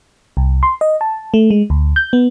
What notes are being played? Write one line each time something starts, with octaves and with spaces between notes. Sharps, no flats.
C2
C6
D#5
A5
A3
G#3
D2
G6
B3